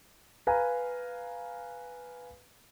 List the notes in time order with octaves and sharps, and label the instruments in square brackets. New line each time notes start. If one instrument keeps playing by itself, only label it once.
[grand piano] B4 F5 G#5 A#5